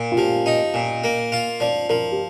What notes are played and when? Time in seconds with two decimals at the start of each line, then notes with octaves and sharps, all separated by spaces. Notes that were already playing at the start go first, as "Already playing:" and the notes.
Already playing: A#2
0.12 F4
0.17 F3 G4
0.46 D#4 D#5
0.74 A#2
1.04 A#3
1.32 F4
1.60 F3 D5
1.90 F3 A#4
2.12 G4